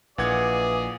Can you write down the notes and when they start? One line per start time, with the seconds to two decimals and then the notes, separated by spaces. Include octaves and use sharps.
0.18 A#1 A#2 E3 G#4 D5 D#5 F#5 G#6